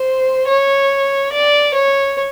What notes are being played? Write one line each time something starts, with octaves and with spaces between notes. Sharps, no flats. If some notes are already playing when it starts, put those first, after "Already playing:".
Already playing: C5
C#5
D5
C#5